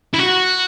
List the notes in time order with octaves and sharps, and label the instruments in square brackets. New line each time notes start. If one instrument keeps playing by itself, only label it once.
[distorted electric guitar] E4
F#4